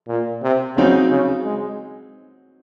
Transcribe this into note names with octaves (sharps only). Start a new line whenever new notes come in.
A#2
C3
C#3 F#3 C4 D#4 F#4
C#3
G#3